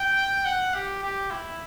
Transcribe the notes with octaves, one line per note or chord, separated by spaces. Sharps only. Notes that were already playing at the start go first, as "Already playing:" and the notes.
Already playing: G5
F#5
G4
G4
E4